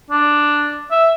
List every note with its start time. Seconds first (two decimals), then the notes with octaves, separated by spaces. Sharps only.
0.10 D4
0.91 E5